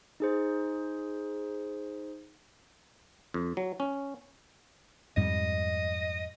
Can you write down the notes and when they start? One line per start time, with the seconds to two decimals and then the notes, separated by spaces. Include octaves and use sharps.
0.20 D#4 G#4 C5
3.34 F2
3.57 F#3
3.80 C#4
5.17 F2 G#2 G3 D#5